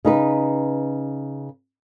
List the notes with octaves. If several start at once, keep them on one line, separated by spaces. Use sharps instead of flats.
C#3 D#4 B4